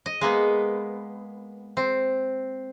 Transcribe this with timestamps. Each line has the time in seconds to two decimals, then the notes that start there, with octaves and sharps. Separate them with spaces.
0.06 D#5
0.21 G#3 A#3 B3
1.77 C4